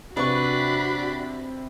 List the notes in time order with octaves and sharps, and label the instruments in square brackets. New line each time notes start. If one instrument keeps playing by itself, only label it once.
[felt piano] C3 [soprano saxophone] D4 [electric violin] F#4 B5 [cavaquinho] B4 C#6